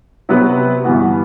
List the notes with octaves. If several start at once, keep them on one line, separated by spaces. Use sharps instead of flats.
C3 F#3 B3 F#4 B4
G2 E3 B3 F#4